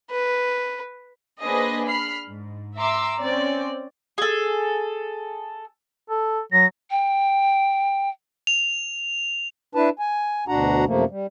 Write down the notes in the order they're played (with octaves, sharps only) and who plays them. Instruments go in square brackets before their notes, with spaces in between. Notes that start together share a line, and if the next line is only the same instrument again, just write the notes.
[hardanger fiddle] B4
[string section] A#3 D4 G#4 B4 C5 D#5
B5 F6 C7
G#2
E5 A#5 C6 D6 E6
C4 C#4 D5
[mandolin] G#4 A4
[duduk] A4
[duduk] F#3 [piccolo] A#6
[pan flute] G5
[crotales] F7
[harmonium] D4 E4 B4 A5
G#5
D2 B2 D4 F#4 F#5 A#5
F#2 C3 F3 A3 A#3
G3